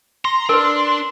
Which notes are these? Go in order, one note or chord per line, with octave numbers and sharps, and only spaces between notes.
A#5 C6
D4 A#4 B4